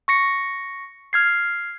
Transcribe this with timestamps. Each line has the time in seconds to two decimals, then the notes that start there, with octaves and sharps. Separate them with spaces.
0.08 C#6 A#6 C#7
1.13 F6 G#6 C7